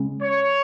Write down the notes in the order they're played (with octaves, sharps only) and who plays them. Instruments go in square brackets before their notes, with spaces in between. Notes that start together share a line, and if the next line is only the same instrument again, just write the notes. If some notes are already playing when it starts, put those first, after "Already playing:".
Already playing: [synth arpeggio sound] C#3 G#3
[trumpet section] C#5